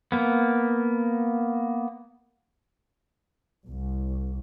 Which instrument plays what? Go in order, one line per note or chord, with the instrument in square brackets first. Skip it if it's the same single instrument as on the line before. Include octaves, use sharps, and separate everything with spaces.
[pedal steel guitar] A#3 B3
[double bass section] C2